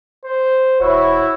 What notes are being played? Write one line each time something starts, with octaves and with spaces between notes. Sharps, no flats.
C5
E1 E4 F#4 C#5